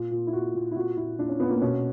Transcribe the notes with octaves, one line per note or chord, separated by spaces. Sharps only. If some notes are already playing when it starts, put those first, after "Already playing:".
Already playing: A#2
A#2
E4
A#2 F#4
A#2
E4
A#2 F#4
A#2 E4
A#2 D4
C#4
A#2 B3
A#3
B2 C#4